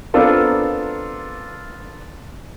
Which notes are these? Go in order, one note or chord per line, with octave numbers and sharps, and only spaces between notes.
B3 C4 D4 F4 A4 A#4